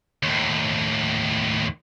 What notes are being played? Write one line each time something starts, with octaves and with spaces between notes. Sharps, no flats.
D#2 A2